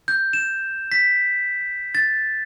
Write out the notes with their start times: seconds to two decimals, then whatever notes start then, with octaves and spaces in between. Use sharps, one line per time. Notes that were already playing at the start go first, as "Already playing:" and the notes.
0.08 G6
0.33 E7
0.92 B6
1.95 A6